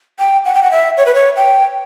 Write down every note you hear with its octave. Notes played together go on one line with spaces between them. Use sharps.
G5
F#5
G5
F#5
E5
C#5
B4
C#5
G5